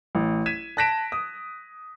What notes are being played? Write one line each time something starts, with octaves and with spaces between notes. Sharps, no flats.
A1
G#6 B6 D#7 E7
A5 F#6 A#6 B6 D7 E7
D#6